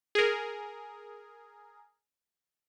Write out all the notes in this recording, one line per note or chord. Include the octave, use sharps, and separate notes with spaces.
G#4 A#4